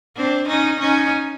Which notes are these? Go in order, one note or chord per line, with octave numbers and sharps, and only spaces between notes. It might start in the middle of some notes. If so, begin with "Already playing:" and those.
C4 D4
C#4 D#4
C#4 D#4